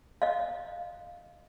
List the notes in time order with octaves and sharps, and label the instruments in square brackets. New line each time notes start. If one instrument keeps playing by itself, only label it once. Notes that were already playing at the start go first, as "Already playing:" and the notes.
[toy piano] D#5 F5